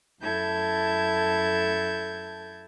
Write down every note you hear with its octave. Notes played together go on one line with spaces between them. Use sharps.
F#2 E4 A4 A5 G6 G#6